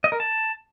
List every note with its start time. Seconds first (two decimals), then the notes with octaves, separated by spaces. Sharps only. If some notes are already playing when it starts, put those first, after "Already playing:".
0.04 D#5
0.12 A#4
0.20 A5